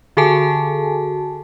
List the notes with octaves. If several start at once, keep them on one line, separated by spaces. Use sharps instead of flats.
D3 F#4 G#4 A4 G#5 A5